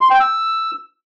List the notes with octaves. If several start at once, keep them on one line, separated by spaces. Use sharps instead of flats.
C6
G5
E6